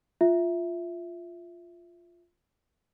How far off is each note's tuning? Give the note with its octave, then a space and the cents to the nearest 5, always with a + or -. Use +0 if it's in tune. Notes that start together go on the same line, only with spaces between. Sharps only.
F4 +0 E5 +0